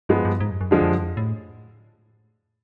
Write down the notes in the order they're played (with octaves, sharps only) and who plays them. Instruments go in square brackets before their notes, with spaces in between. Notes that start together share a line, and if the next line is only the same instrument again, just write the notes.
[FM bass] G2 [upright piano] F3 G#3 B3
[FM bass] G2
G#2
F#2
F#2
[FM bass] F2 [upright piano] D3 F3 G#3
[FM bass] F2
F#2
F2
A2